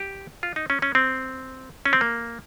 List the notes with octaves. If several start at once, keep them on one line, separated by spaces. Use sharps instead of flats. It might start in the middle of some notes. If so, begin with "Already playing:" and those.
Already playing: G4
F4
D#4
C#4
C#4
C4
C#4
C4
A#3